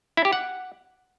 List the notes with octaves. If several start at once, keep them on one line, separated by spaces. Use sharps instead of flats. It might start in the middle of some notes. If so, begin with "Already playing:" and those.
E4
G4
F#5